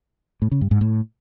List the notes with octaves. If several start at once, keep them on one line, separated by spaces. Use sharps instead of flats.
A2
C#3
G2
G#2
A2